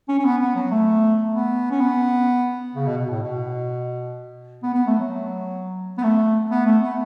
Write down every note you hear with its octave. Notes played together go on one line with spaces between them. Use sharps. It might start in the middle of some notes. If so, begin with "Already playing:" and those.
C#4
C#4
B3
B3
F#3
A3
B3
C#4
B3
C#3
B2
B2
A2
B2
B3
B3
A3
F#3
B3
A3
B3
A3
B3